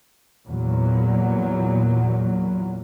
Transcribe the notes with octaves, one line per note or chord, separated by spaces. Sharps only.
E2 A#2 F#3